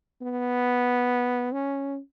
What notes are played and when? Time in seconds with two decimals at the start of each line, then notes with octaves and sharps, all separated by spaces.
0.22 B3
1.52 C#4